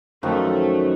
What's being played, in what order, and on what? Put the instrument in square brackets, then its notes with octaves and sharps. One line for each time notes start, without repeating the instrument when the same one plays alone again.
[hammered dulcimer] F#2 D#3 F3 [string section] A3